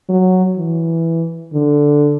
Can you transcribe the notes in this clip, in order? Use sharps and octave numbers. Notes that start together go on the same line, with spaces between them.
F#3
E3
D3